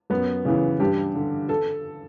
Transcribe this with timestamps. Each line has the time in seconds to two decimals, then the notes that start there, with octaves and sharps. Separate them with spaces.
0.10 F#2 B3
0.45 C#3 E3
0.80 G2 G4
1.15 D3
1.49 A4